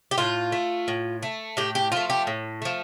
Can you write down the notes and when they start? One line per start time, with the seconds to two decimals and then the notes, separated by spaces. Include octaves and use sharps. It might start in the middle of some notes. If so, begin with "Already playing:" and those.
0.11 G4
0.18 A2 F4
0.52 A3
0.88 A2
1.23 A3
1.57 A2 G4
1.75 G4
1.92 F3 A3 F4
2.10 G4
2.27 A2
2.62 F3 A3